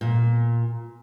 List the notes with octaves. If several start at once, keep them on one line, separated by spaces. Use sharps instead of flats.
A#2